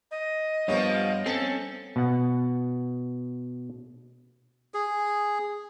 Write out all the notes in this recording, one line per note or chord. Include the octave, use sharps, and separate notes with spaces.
D#5
G2 F3 G3 A#3 B3 C#5
C4 C#4 A4
B2 F#5
G#4